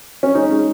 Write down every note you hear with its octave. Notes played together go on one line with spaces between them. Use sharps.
C#4
G#3 D#4
G#3